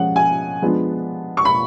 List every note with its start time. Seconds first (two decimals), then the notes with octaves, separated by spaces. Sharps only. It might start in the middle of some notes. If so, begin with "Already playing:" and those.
Already playing: F3 G#3 C#4 F#5
0.16 G#5
0.62 F3 G#3 B3 D4 F4
1.37 C#6
1.45 B5